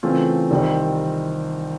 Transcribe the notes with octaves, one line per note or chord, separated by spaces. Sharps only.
C#3 E3 A3 C4 F4
C2 C3 D#3 G3 C4